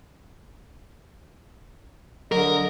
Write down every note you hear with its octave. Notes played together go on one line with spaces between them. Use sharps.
D3 F#3 A#4 D#5